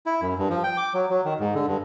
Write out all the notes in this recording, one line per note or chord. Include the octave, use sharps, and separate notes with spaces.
E4
F#2
G2
F3
G5
D6
F#3
F#3
D#3
G#2
D3
G2